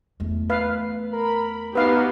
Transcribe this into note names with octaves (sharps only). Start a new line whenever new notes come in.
E2 A3
B4 F5
A#4 B5
B3 D#4 F#4 G4 B4 F5